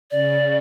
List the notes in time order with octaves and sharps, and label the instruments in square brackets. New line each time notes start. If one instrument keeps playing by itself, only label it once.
[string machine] C#3 [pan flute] D5